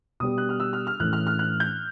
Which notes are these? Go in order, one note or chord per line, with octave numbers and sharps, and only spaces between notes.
B2 G3 B3 D#6
F#6
F6
E6
F6
F6
A2 E3 A3 C#4 E4 F#6
F6
F6
F#6
G6